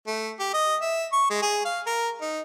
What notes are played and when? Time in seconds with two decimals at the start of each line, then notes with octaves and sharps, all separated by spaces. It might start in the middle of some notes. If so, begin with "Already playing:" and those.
0.07 A3
0.40 G4
0.54 D#5
0.82 E5
1.12 C#6
1.30 G#3
1.42 G#4
1.65 F5
1.87 A#4
2.21 D#4